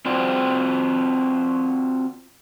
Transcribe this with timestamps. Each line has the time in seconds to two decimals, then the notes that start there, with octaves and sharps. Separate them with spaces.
0.06 C4 F4 F#4 C5 D5 G5